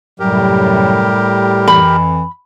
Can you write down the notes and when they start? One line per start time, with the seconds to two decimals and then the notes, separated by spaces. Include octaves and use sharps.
0.20 F#2 A2 C3 F#3 G3 G4 A#4
1.68 F2 E3 B5